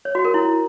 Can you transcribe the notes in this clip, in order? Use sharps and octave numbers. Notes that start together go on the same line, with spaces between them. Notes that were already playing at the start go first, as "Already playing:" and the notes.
C#5
F#4
A#4
E4